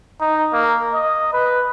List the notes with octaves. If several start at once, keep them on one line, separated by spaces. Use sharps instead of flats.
D#4
A#3
D#5
B4